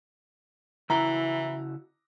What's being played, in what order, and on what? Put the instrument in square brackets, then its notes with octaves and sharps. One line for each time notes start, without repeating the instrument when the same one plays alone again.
[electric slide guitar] C#3 E4 F#4 [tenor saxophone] E3 [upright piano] A#5